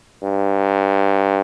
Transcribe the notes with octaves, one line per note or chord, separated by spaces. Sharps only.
G2